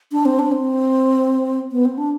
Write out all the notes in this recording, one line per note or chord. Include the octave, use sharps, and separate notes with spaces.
D4
C4
D4
C4
B3
C4
D4